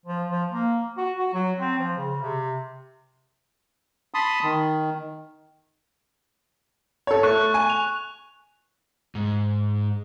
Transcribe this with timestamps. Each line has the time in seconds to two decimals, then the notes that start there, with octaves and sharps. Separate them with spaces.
0.06 F3
0.29 F3
0.51 A#3
0.98 F#4
1.18 F#4
1.33 F#3
1.59 C4
1.79 F3
1.97 C#3
2.22 C3
4.14 A5 B5 C6 D#6
4.44 D#3
7.07 A4 C#5
7.23 A3 C#6 F#6
7.54 G#5
7.70 F7
9.15 G#2